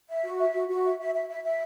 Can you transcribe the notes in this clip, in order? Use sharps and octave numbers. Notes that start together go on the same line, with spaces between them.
E5
F#4
E5
F#4
F#4
E5
E5
E5
E5
E5